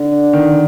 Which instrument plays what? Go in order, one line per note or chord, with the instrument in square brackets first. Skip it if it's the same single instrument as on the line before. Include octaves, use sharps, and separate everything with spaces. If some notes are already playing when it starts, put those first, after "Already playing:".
Already playing: [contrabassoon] D3
[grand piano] D#3